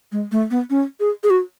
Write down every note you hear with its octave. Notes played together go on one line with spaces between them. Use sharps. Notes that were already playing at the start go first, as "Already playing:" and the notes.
G#3
A3
B3
C#4
G#4
G#4
F#4